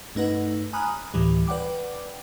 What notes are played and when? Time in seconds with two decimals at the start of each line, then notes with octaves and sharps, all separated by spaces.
0.15 G2 A3 D#4 B4 F#5
0.73 G#5 A#5 B5 D#6 F6 F#6
1.14 D2 A2 E3 G3
1.47 B4 D5 F#5 G5 D6